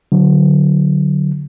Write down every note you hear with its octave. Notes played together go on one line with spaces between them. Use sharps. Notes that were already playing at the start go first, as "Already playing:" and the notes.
D3 F#3